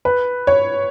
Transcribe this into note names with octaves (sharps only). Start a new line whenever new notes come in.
B4
C#5